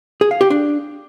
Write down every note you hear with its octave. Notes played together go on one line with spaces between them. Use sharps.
G#4
F5
G4
D4